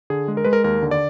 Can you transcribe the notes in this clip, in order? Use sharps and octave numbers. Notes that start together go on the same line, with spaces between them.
D3 G#4
G#3
A#4
G#3 B4
A#4
D#2 A#4
D3
D5